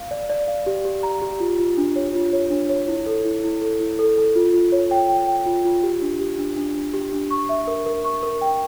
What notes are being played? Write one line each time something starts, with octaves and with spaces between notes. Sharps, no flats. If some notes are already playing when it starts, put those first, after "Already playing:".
Already playing: F5
D5
D5
F5
G4
G4
A#5
G4
F4
F4
D4
C#5
F4
C#5
D4
C#5
E4
A4
E4
E4
A4
E4
A4
A4
F4
F4
C#5
G5
G5
G5
F4
F4
G4
D4
G4
D4
D4
D4
G4
D4
C#6
E5
A#4
A#4
C#6
A#4
G5